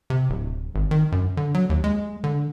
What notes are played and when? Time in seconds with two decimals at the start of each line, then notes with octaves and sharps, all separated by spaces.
0.10 C3
0.29 D1
0.75 G#1
0.91 D#3
1.12 F#2
1.37 D3
1.54 F#3
1.70 D#2
1.84 G#3
2.24 D3